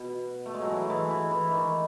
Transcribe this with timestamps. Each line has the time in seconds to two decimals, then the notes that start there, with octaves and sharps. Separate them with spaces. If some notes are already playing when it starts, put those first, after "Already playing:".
Already playing: B2
0.46 A3
0.54 G#3
0.62 F#3
0.69 E3
0.82 A3
0.90 E3 G#3
1.10 E3
1.31 E3
1.51 D#3